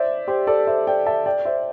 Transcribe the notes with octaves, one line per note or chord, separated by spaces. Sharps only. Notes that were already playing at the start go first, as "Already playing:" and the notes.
Already playing: C5 D5 E5
G4 C5
A4 D5
C5 E5
D5 G5
E5 A5
D5 G5
C5 E5